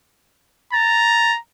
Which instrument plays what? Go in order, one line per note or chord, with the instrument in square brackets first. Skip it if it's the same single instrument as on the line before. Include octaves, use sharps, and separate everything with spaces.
[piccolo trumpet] A#5 [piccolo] A6